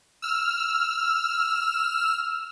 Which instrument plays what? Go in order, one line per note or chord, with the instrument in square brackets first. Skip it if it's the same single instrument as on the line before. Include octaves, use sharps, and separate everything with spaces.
[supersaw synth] E6 F6